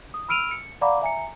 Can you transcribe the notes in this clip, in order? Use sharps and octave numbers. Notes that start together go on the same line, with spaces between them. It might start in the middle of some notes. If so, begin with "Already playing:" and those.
D#6
B5 E6 F6 D7 D#7 F7
C#7
D5 F5 F#5 A#5 B5 D6
E5 G#5 A#5 C#7